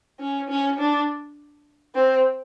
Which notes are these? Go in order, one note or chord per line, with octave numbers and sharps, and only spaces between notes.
C#4
C#4
D4
C4